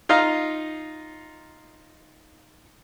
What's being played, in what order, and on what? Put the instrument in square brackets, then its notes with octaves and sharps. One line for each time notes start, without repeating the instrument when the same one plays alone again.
[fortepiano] D#4 F4 F5 A#5